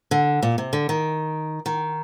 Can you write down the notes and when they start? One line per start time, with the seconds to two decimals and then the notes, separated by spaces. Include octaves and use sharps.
0.11 D3
0.43 A#2
0.58 C3
0.73 D3
0.89 D#3
1.66 D#3